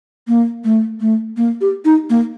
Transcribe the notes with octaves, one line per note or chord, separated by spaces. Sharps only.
A#3
A3
A3
A#3
G4
D#4
A#3